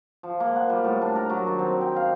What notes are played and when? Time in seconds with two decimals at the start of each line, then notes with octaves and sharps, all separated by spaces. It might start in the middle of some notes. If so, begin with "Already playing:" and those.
0.23 F3
0.40 A#3
0.56 F#5
0.70 G3
0.84 A2
1.02 D4
1.16 A#4
1.30 F#3
1.47 D#3
1.59 C4
1.81 G5
1.96 F5